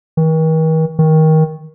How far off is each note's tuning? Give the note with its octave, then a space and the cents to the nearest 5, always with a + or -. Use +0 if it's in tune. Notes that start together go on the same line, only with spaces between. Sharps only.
D#3 +45
D#3 +20